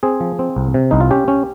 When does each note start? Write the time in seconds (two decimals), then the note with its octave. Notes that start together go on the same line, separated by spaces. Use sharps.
0.03 C4 G#4
0.20 F3
0.39 C4
0.56 C2
0.74 C3
0.91 C2 D#4
1.01 F4
1.10 C#4 G4
1.28 C#4